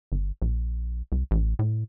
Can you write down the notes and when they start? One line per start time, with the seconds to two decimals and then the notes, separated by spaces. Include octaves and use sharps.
0.12 G1
0.42 A#1
1.12 C2
1.31 A1
1.59 A2